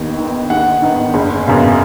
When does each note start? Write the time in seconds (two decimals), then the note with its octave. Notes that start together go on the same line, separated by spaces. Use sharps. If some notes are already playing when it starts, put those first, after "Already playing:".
Already playing: D#2 D#3 B3 D#4
0.18 D#3 B3 D#4
0.50 D#2 F#5
0.82 D#3 B3 D#4
1.14 F#1
1.46 F#2 C#3 B3